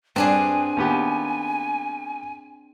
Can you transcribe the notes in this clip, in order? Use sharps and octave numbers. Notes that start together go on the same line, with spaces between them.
G2 C4 D4 G#4 G#5
D#2 B3 G4